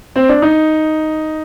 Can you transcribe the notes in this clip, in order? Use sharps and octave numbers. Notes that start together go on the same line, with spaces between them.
C4
D4
D#4